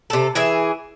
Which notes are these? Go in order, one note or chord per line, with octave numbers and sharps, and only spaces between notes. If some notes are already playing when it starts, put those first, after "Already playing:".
C3 A4
E3 G#4 E5